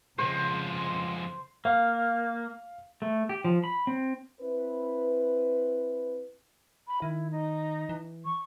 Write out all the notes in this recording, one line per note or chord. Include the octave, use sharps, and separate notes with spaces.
F2 C#3 G#3 C5
A#3 F5
A3
G4
F3
B5
C4
C4 E4 B4
B5
D#3 E4
D#4
E3
C#6